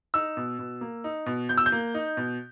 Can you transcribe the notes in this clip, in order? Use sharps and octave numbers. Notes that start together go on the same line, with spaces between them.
D#4 E6
B2
B2
A#3
D#4
B2
B2 G6
E6
G6
A#3
D#4
B2